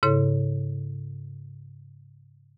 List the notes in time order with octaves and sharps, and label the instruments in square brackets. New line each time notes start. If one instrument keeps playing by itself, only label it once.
[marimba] G#2 C#3 E4 A4 C#5